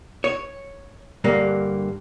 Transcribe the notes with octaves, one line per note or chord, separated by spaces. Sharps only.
C#5
G2 D3 A#3